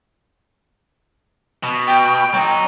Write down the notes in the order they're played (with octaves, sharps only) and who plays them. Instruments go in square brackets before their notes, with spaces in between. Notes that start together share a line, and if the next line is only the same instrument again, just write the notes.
[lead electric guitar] B2
[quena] G5
[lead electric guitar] F#3 D#4